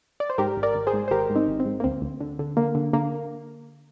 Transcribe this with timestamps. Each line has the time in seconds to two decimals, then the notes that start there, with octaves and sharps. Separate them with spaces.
0.20 D5
0.30 C5
0.38 G#2 G4 A#4
0.57 G#1
0.63 A#4 D5
0.75 G#1
0.87 G#4 C5
0.93 G#2
1.08 C5
1.11 G#1 G4 A#4
1.30 G#2
1.35 C4 D#4
1.48 G#1
1.60 C4
1.66 G#2
1.80 A#3
1.84 D2 C4
2.02 D2
2.20 D3
2.39 D3
2.57 D3 A#3
2.75 D3
2.93 D3 A#3